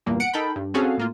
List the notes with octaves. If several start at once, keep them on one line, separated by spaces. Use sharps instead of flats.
E2 G2 A#2 A#3
F#5 C#7 D7
D#4 A4 A#4 G5 B5
G2
C4 C#4 F#4 G#4 A4 F5
A2 A#3 F4